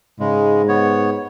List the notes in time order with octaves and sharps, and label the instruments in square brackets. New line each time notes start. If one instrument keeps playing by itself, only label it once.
[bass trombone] G#2 [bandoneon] C#3 G#3
[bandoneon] B3 C#5